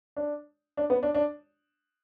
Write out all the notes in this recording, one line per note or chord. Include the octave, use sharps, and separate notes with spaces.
D4
D4
B3
D4
D4